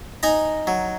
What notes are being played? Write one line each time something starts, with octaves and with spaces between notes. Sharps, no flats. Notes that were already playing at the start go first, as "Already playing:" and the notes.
D#4 G#5 A#5
F#3